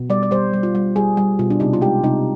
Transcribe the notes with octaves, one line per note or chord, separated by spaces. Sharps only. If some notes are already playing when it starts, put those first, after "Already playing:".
Already playing: B2
G3 D5
D5
G3 C5
G3
F4
G3
G3 G#4
G3
B2 F4
D4
C3 D#4
F4
G#3 G4
C3 D#4